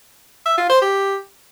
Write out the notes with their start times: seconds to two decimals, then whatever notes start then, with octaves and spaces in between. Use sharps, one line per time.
0.46 E5
0.58 F4
0.70 C5
0.82 G4